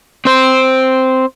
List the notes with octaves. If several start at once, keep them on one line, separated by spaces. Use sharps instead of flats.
C4 C5